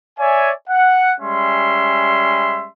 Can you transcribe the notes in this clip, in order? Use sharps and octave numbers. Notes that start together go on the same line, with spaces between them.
C#5 D5 E5 G#5
F#5
G3 G#3 C#4 E5 C6